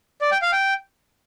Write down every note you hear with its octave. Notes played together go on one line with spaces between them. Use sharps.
D5
G5
F5
G5